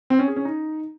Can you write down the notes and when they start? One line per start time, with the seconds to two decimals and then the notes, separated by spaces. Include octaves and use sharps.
0.10 C4
0.19 C#4
0.28 G#4
0.36 C#4
0.45 D#4